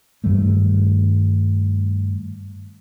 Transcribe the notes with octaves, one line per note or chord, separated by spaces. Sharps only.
G2 D#3 G3 A3